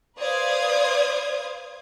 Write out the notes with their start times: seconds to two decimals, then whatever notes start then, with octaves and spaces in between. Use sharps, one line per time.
0.19 B4 C5 D5 F5 D#6 G#6